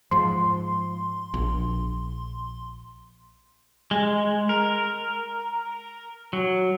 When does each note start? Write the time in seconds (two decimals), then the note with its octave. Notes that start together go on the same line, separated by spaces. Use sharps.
0.11 G#2 F3 C6
1.34 A#1
3.91 G#3
4.49 A#4
6.33 F#3